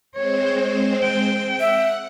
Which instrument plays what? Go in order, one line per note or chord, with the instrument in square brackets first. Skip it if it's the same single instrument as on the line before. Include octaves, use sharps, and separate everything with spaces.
[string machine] G#3 C4 C5 [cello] C#5
[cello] G5
[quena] E5 [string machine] F#5